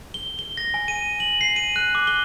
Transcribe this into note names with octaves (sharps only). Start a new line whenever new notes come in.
G7
G7
A#6
G#5
D#7
F#7
C7
D#7
F#6
D6
G7